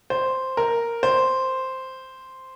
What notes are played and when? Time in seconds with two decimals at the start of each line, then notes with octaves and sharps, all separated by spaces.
0.10 C5
0.57 A#4
1.03 C5